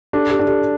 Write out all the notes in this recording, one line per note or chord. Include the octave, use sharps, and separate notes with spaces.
D4 G4 A4
G4 A4
D4
G4 A4